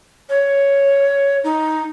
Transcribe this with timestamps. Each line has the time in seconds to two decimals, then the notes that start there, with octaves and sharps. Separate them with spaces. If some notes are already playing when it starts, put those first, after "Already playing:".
0.29 C#5
1.44 D#4